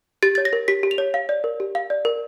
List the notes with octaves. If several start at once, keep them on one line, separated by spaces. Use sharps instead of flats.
G4 A6
C#5 A6
A#6
A#4
G4 B6
G4
F7
C#5
F5
D5
A#4
G4
F5
D5
A#4